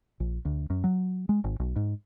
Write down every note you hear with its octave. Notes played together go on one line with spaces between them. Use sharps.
A#1
D2
F#2
F#3
G#3
G#1
B1
G#2